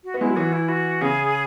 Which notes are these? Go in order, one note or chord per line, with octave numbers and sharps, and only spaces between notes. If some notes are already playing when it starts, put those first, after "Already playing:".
F#4
B3
G#3 E4
F#3
E3 F#4
E4
F#4
C#3 G#4